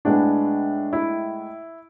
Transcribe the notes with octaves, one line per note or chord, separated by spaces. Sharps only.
A2 G#3 B3 D4
E4